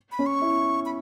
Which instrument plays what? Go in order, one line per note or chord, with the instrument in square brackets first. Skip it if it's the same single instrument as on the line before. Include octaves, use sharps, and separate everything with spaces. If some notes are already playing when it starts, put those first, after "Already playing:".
[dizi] B5
[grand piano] C#4
[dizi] C#6
[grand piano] E4
[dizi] B5